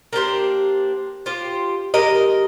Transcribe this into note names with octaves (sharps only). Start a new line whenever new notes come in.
A#3 D4 G4 C5
F4 G4 C5
G#3 G4 A#4 D#5